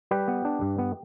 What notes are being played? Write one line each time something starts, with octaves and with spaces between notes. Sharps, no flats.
G3 G4 B4
B3
D4
G2
B3